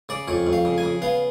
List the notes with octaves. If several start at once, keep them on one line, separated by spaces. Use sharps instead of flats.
C#3 D5
F2 C#5
F2
F5
C#3
G#5
C#3
B3 F5